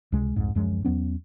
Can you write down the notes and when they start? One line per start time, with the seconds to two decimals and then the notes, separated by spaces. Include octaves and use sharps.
0.12 C#2 C3 G#3
0.36 C2 F2 G#2
0.55 D1 F#2 F3 G#3
0.85 E2 F#3 B3 C#4